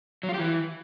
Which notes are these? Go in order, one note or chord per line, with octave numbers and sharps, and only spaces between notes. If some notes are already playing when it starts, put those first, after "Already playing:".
F#3
F4
G4
E3